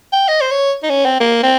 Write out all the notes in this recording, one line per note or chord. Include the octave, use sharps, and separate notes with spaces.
G5
D#5
C5
C#5
D#4
C#4
C4
A#3
C4